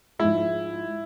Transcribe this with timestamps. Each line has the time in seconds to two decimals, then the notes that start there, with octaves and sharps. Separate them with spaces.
0.19 G#2 F3 G#3 E4